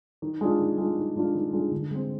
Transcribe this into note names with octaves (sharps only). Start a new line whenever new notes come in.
D#3
G#3 D4 F4
D#3
G#3 D4 F4
D#3
G#3 D4 F4
D#3
G#3 D4 F4
D3
G#3 C4